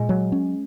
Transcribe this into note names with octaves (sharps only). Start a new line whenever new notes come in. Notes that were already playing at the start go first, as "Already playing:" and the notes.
Already playing: A#2 G#3
F#3
C#4